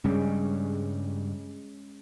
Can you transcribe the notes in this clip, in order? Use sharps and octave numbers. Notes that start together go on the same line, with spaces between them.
G2 C#3 G3 G#3 C#4